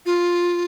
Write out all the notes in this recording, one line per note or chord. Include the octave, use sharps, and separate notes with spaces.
F4